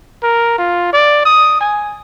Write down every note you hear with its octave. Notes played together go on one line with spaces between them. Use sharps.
A#4
F4
D5
D#6
G#5